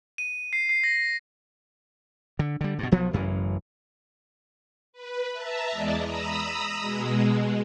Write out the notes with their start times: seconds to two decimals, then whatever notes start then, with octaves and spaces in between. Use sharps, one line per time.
0.18 D#7
0.53 C7
0.69 C7
0.84 A#6
2.39 D3
2.61 D3 G3
2.79 G2 B2
2.92 B1 F3 F#3 B3
3.13 A1 F#2 C#3 E3
4.93 B4
5.33 E5 A5 A#5
5.71 E2 G#3 D5 D#5
6.03 A#5 B5 D#6 E6
6.81 B2 G#3